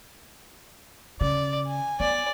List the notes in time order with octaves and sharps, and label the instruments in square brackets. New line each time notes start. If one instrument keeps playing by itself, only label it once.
[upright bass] C#3 [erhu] D5
[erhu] G#5
[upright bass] B3 [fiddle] D5